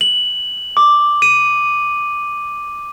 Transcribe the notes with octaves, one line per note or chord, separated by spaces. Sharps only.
F#7
D6
D#7